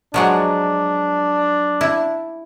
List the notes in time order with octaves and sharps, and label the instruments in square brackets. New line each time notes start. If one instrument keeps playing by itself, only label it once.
[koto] F3 F#3 G#3 [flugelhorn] D4
[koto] E4